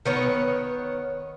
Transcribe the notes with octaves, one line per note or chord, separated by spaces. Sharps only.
D#3 B3 C#5